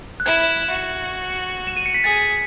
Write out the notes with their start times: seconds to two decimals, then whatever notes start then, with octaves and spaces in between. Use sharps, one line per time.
0.20 F#6
0.26 E4 G#6
0.70 F#4
1.67 E7
1.77 D#7
1.86 C#7
1.94 B6
2.04 G#4 A6